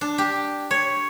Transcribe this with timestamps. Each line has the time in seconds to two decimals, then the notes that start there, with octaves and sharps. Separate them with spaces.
0.01 D4
0.18 G4
0.71 C#5